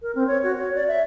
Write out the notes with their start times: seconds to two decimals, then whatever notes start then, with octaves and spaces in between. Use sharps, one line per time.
0.02 A#4
0.15 C4
0.27 C#5
0.43 F#4
0.58 C#5
0.75 D5
0.88 E5